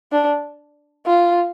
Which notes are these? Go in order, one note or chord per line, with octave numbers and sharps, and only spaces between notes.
D4
F4